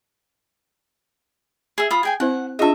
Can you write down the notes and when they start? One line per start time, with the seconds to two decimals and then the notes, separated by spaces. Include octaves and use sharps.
1.78 G#4 E5
1.91 F4 B5 D#6
2.03 G#4 G5 G#5
2.20 C4 E4 C5 F#5
2.59 D4 F4 G#4 D#5 E5